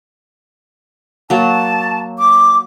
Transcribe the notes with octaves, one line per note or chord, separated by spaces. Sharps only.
F#3 A#3 A5
D6